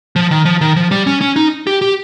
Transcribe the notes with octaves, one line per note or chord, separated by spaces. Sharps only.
F3
D#3
F3
D#3
F3
G3
C#4
C#4
D#4
G4
G4